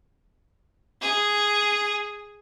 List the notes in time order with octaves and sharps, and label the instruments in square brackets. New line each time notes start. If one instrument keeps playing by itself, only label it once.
[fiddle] G#4